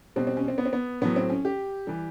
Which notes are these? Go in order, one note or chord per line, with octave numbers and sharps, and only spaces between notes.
B2 G3 C4
C4
C#4
C4
B3
C4
B3
A2 F#3 B3
C4
C#4
G4
E3 G3